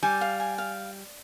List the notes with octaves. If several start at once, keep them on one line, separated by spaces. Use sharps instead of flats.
G3 G#5
F5
G#5
F5